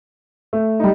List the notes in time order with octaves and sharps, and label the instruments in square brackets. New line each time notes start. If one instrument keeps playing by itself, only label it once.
[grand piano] A3
[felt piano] G3 D#4